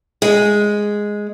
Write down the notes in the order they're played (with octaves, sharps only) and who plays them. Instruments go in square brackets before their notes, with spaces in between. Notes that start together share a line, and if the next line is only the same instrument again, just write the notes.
[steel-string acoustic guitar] G#3